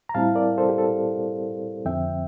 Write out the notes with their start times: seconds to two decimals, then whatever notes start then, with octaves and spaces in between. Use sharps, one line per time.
0.09 A#5
0.14 A2 G3 C4 E4 F5 A5
0.35 A#4 D5
0.58 A4 C5
0.69 G4
0.78 A4
1.85 F2 D3 F3 C4 E5 G5